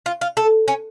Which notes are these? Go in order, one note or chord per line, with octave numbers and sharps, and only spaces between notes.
F4
F4
A4
C#4